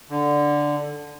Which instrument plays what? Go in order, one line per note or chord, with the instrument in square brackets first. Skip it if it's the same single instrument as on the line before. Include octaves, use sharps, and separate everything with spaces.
[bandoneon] D3